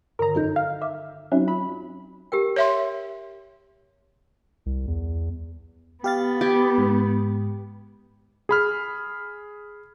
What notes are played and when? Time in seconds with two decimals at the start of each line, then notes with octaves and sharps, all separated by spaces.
0.19 G2 D3 D#3 A#4 A#5
0.35 G#1 F#2 D#4 A4 D#5 G6
0.56 F5 F6
0.82 E5 D6
1.32 F#3 C4 C#4 D#4 E4 F#4
1.48 F4 B5
2.32 G4 A#4 G5
2.56 C#5 E5 C6
4.66 C2
4.88 E2
6.04 B3 G4 F5 A6
6.41 G4 G#6 A6
6.78 G#2
8.49 G#4 B5 F6